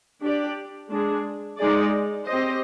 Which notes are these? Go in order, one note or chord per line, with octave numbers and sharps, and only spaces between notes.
D4 G4 D5
G#3 D4 G#4
G#3 D#4 G#4 D5
C4 G4 C5 D#5